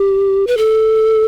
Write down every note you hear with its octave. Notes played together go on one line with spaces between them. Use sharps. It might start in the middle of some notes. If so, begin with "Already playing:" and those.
Already playing: G4
B4
A4